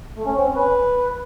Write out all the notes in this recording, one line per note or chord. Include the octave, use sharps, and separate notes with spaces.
A3
C#4
C4
C#4
B4